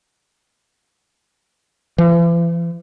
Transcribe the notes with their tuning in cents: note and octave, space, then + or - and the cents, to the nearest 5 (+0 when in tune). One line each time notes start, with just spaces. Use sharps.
E3 +45